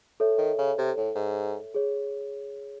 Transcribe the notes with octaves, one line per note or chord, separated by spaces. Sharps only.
A4 C#5 E5
D#3
C#3
C3
A2
G#2
G#4 C#5